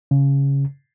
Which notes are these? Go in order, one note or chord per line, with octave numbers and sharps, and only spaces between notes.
C#3